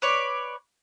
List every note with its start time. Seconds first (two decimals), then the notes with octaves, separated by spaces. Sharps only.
0.02 B4 C#5 D5